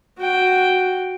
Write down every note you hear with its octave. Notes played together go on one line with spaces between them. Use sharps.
F#4 G5